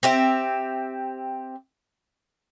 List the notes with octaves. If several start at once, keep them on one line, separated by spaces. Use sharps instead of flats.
C4 G4 E5